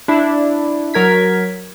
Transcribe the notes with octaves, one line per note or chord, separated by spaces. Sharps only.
D4 E4
F#3 A#4 G#6 B6